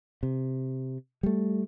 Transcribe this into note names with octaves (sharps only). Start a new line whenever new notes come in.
C3
G3 A3